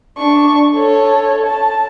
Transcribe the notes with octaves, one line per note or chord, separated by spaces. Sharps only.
D4 C#6
A4 C#5
A5